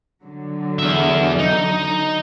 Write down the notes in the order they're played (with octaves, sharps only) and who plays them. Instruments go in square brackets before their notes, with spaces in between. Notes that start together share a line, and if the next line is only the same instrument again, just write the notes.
[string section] D3 F#3
[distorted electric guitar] E2 E5
D#4